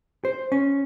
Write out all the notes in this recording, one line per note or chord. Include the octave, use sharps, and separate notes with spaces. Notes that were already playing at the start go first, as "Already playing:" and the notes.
C5
C#4